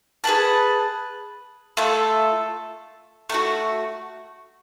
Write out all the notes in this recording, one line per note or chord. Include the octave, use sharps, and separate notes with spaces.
G#4 B4 F#5 A5
A3 F4 A4
A3 D4 F#4